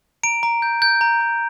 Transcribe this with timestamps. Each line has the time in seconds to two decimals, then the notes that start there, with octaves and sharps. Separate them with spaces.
0.23 A#5 D7
0.43 A#5
0.62 G6
0.82 G6
1.01 A#5
1.21 A#5